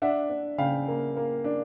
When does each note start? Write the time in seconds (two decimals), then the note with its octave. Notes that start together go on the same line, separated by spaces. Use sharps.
0.02 D4 E5 F#5
0.30 D4
0.58 C#3 F5 G5
0.88 A#3
1.17 A#3
1.44 D4